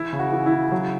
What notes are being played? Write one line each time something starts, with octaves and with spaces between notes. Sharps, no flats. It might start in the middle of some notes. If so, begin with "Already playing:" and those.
Already playing: E3 E4
C#3
F#4
E3
E4
C#3
F#3